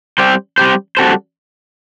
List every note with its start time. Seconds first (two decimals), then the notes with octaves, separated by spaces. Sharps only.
0.18 G3 C4 G4 C5
0.58 G3 C4 G4 C5
0.97 G3 C4 F#4 A4 C5